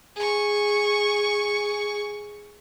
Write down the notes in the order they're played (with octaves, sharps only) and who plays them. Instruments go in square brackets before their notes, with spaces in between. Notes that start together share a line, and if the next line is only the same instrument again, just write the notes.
[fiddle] G#4 C#6